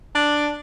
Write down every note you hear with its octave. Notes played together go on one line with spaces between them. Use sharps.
D4